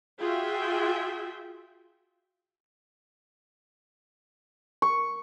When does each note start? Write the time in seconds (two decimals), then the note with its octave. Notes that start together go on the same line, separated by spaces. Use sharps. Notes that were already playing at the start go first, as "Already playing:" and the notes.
0.20 F4 F#4 G#4 E5 G5
4.82 C#6